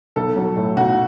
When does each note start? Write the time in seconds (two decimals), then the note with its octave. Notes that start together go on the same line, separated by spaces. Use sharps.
0.16 B1 A4
0.36 F#3
0.56 A2
0.77 B1 F#4